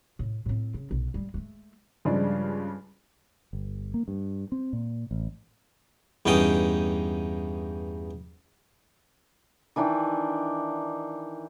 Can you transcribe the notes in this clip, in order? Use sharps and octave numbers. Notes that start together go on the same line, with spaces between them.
A2
A2 C4
C#3
B1
G3 G#3
G#3 A3
G2 C#3 F3 G#3 D4
G1
A#3
G2
C4
A#2
A1
E2 G2 C#4 D#4 G5 D#6
D#3 E3 D4 G5